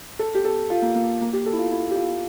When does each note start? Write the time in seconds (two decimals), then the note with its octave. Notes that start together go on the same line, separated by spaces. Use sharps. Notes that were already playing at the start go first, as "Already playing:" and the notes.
0.19 A4
0.35 G4
0.45 A4
0.70 F4
0.82 A#3
0.95 A#3
1.21 A#3
1.33 G4
1.46 A4
1.53 E4
1.58 F4
1.71 E4
1.91 G4
1.96 F4